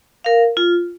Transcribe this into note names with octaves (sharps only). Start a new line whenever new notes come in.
A#4 F5
F4